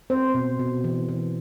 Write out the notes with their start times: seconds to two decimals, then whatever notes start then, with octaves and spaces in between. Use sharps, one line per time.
0.10 C4 C5
0.34 B2
0.59 B2
0.84 E3
1.09 E3